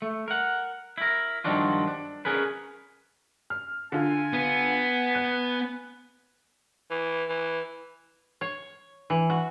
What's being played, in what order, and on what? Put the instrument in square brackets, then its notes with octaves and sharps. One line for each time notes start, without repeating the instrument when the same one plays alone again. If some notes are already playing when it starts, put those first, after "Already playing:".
[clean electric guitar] A3
A#4 F#5
E4 A#4
G2 D#3 F3 F#3 D4 F4
D4
C#4 G#4 A#4 B4
[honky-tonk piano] F6
[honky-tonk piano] D3 F4 [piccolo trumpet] G#5
[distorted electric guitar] B3
[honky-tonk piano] F#6
[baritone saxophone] E3
E3
[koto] C#5
E3
F#4